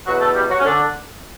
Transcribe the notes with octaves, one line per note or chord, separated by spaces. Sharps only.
E2 B2 F#3 F#4
A3 A4
G3 G4
F#3 F#4
C#4
D3 D4